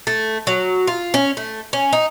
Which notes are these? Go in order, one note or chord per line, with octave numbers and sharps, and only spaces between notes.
A3
F#3
F4
C#4
A3
C#4
D#4